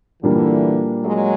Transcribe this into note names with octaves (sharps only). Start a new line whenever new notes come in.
A#2 D3 E3 G3 A#3 D4
F#3 G#3